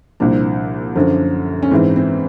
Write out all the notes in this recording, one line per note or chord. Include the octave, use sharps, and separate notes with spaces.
C2 A#2 F3 D4
F#2 D3 F3
C#4
G#2 E3 C4
C4